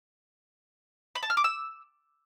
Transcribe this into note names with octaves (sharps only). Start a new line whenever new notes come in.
B5
A5
F6
D6
E6